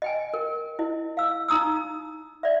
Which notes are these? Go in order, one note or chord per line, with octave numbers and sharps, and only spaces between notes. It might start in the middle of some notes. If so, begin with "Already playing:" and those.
D#5 G5 G#5
A#4
E4 D#5
F5 E6
D#4 A#5 D#6 E6
D5 E5